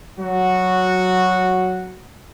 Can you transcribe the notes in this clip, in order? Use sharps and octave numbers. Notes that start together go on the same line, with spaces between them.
F#3 F#4